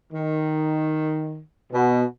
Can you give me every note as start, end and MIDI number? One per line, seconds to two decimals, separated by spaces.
0.13 1.40 51
1.73 2.04 47